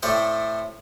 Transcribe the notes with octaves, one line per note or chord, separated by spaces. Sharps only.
A2 A3 C4 D5 G5